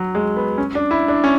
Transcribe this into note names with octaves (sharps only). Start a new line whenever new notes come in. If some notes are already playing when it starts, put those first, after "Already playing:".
Already playing: F#3
G#3
B3
C#4
D4
E4
D4
C#4